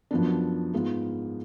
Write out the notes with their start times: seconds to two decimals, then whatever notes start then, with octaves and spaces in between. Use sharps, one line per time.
0.11 F#2 F3 B3 D4
0.73 G#2 G#3 B3 F4